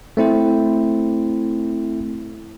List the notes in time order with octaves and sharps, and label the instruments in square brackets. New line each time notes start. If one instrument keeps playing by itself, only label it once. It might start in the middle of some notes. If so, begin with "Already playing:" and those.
[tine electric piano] A3 C4 E4 C5